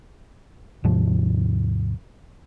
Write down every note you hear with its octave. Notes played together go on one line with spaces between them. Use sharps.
D#2 G#2 C3 F3